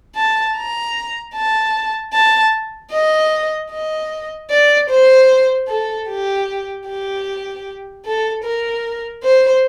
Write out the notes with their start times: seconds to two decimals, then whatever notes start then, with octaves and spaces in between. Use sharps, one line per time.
0.16 A5
0.56 A#5
1.35 A5
2.13 A5
2.92 D#5
3.70 D#5
4.50 D5
4.89 C5
5.68 A4
6.08 G4
6.86 G4
8.05 A4
8.44 A#4
9.23 C5